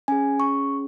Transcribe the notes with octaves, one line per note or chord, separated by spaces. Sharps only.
C#4 G#4 G#5
C#6